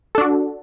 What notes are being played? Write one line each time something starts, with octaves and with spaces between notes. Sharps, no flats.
D4 F#4 A4